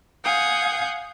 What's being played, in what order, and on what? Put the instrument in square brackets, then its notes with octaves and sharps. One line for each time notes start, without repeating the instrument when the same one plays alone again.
[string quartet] F5 F#5 G#5 D#6 G6